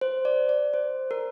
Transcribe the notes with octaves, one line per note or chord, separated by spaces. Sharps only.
C5
D5
D5
C5
A#4